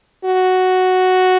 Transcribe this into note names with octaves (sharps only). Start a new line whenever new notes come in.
F#4